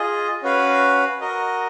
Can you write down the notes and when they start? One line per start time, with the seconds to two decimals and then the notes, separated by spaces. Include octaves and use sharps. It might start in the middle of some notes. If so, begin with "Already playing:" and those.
Already playing: F4 G#4 D#5
0.43 C#4 F#4 B4 F5
1.21 F#4 A#4 D#5